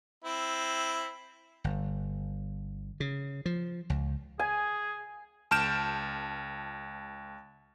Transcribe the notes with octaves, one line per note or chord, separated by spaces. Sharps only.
C4 E4
G1
C#3
F3
C#2
G#4 G#5
C#2 A5 F6 G6 D7 E7